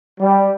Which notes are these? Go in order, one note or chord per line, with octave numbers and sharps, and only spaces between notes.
G3